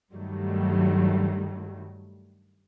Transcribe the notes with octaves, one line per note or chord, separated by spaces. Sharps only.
G2 D#3 F#3 G3 A3